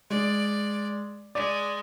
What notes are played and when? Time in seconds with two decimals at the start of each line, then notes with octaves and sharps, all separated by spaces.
0.10 G#3 D5
1.35 G#3 D5